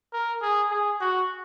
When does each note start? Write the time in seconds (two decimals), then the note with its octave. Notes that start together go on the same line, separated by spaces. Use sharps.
0.13 A#4
0.42 G#4
0.71 G#4
1.01 F#4